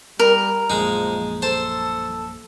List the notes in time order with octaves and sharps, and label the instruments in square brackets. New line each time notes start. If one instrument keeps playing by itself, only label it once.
[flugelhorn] G3 [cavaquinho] A#4
[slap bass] A#1 F#2 [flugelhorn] F3 [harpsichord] G#3 D#4
[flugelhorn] A4 [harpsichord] C5 A5